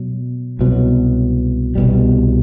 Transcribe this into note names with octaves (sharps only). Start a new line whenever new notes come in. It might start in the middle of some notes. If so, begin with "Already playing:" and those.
Already playing: B2 F#3
C2 B2 F#3
C2 B2 G3